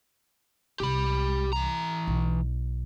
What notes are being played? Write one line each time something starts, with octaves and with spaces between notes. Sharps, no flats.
C2 G4 B5
E3 A#5
B1